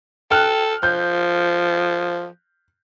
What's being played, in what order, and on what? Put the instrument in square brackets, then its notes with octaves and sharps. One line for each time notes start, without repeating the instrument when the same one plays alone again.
[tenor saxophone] A4 [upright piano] G5 F6 F#6
[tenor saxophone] F3 [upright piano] G6